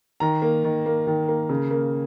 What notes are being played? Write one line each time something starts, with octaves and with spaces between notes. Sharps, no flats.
D#3 A#5
A#3
D#3
A#3
D#3
A#3
C#3
A#3